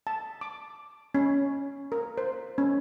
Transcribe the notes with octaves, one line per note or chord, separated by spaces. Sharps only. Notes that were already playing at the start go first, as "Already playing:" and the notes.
A5
D6
C#4
A#4
C5
C#4